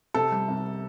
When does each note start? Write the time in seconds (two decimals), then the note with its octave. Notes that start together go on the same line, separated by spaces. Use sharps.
0.14 C3 A4
0.32 G3
0.48 C2